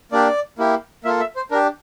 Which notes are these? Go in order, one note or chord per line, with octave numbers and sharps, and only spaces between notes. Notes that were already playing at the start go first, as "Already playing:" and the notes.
A#3 D4 G4 D5
A#3 E4 G4
A#3 F4 A4 E5
E5
C5
D4 G4 A#4